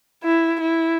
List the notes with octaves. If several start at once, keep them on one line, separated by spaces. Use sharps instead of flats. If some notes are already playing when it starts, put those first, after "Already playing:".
E4
E4